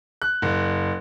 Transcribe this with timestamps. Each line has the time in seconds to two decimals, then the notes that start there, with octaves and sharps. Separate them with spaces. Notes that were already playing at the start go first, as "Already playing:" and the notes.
0.22 F#6
0.42 F#1